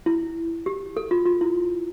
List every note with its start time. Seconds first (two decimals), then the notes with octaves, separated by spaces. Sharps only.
0.06 E4
0.66 G4
0.97 A4
1.11 F4
1.26 F4
1.41 E4